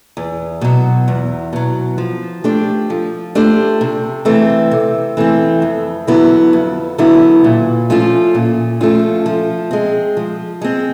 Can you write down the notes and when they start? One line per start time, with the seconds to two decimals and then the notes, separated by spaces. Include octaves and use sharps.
0.17 E2
0.61 B2 F#3
1.08 E2
1.53 B2 F#3
1.98 F3
2.44 A3 D4 G4 C5
2.90 F3
3.35 A3 D4 G4 C5
3.81 C3
4.25 E3 A3 C4
4.71 C3
5.17 E3 A3 C4
5.62 F2
6.07 D3 F#3 B3 E4
6.53 F2
6.98 D3 F#3 B3 E4
7.44 A#2
7.90 F3 A3 C#4 F4
8.35 A#2
8.81 F3 A3 C#4 F4
9.26 F3
9.71 G#3 C4
10.17 F3
10.62 G#3 C4